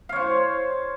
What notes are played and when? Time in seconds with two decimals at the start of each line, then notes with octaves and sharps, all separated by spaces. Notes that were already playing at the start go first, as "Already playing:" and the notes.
0.09 F5
0.13 C#5
0.16 C5